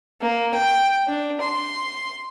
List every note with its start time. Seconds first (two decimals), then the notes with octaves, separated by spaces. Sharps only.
0.21 A#3
0.54 G5
1.07 D4
1.40 C6